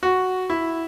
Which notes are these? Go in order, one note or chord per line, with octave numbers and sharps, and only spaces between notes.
F#4
E4